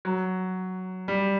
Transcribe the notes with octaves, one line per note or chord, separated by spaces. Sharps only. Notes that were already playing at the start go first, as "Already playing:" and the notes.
F#3
G3